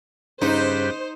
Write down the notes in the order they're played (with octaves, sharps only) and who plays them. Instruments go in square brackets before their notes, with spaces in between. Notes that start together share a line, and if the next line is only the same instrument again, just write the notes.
[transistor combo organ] G2 G4 B4 [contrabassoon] C#3 [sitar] D#4 [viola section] C5